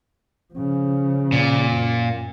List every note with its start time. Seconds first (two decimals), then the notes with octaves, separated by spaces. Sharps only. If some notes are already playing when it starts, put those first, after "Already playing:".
0.54 C#3 F3
1.32 A#2
1.71 F#2